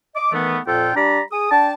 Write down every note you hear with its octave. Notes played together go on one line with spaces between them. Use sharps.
D#5 D6
D#3 E3 A3 B3
F2 A#2 F4 A4 G5
G3 D4 D5 A#5 B5
G#4 D#6
D4 G5 A5